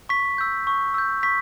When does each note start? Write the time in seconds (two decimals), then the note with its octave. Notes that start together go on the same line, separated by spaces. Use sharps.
0.09 C#6 B6
0.38 E6 G6
0.67 C#6
0.94 E6 G6
1.23 C#6 B6